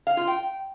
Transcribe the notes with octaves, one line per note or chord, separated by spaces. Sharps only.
F5
F4
G5